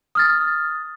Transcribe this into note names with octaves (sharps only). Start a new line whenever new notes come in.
D#6 F6 A6